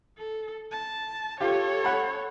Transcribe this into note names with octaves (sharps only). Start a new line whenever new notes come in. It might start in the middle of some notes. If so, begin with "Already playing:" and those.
A4
A5
F4 G4 A4 C#5
F#5 B5